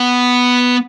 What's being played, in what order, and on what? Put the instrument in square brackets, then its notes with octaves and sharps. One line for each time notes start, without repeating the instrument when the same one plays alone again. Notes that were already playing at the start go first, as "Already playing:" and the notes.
Already playing: [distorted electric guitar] B3